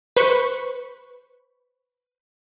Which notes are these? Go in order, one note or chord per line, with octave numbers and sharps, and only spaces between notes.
B4 C5 B5 C#6